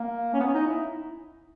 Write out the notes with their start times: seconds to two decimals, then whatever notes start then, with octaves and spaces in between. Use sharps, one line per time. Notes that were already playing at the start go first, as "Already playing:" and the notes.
Already playing: A#3
0.34 C#4
0.40 B3
0.47 C#4
0.54 D#4
0.68 E4